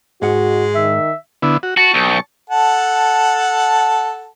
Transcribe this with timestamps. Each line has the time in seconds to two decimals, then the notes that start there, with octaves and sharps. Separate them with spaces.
0.22 G#2 G#3 F#4 F#5
0.75 D#3 E5
1.42 D3 B3 E4
1.63 F#4
1.77 F#4 A5 C#6
1.94 B1
2.50 A4 F#5 A5